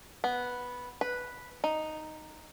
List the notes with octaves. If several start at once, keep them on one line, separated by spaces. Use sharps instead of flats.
B3
B4
D#4